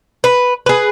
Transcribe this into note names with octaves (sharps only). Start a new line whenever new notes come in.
B4
G#4 B4